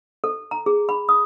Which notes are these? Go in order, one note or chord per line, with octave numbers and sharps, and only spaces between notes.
A4
A#5
G#4
B5
D#6